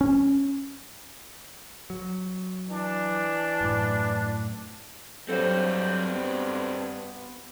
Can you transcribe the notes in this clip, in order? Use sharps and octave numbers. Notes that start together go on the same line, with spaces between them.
C#4
F#3
E3 D4
F#2 A2
G2 F#3 C4 F#4 A4 C5
B3